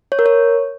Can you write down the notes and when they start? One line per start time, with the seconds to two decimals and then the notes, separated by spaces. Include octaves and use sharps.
0.12 C#5
0.19 A#4
0.26 C#5